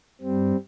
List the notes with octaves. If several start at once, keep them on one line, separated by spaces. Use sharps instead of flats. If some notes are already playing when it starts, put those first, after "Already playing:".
G2 G3 C4